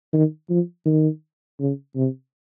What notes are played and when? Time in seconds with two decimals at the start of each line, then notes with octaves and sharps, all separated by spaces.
0.13 D#3
0.49 F3
0.86 D#3
1.60 C#3
1.96 C3